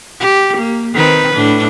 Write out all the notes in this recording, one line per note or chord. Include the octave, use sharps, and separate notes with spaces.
G4
A#3
D#3 C4 B4
A2 D4